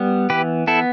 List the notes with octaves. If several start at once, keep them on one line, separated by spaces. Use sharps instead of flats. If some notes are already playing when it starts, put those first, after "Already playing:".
Already playing: G3 B3
E3 G4 B4
B3 E4 A4